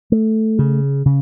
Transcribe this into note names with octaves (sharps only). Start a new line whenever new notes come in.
A3
C#3
C#3